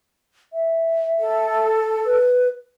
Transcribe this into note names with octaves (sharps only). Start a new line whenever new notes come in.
E5
A4
B4